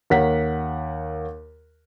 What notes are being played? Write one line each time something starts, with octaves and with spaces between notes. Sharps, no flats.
D#2 A#4 C#5 F#5 B6